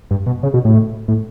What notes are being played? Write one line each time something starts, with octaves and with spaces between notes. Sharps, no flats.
G2
B2
C#3
B2
A2
A2